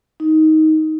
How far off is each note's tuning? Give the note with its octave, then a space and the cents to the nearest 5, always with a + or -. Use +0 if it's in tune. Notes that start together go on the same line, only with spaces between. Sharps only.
D#4 +15